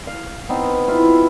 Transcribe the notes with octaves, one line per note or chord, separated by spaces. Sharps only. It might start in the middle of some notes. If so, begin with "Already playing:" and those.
F5
B3 C4 D#4
E4 F4